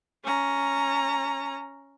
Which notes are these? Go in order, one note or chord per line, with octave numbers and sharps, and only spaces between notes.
C#4 A#5